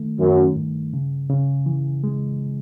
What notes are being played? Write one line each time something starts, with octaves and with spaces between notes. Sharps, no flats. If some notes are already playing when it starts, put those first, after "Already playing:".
Already playing: D#3 A3
F#2 D#3
G2
C#3
C#3
E3
G#3